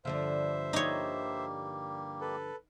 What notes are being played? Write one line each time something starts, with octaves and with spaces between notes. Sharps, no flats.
G2 D3 F3 C5 E5
G3 A#3 D#4 G4 C#5
A4 B4